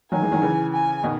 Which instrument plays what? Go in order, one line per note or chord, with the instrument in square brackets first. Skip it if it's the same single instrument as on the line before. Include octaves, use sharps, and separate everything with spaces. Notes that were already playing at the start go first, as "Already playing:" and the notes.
[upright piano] D#3 F#3 [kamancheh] G#5
[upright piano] E3 G#3
D#3 F#3
C#3 E3
[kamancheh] G#5
[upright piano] B2 D#3